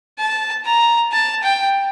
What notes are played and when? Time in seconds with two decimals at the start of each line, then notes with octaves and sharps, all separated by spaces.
0.18 A5
0.65 A#5
1.12 A5
1.43 G5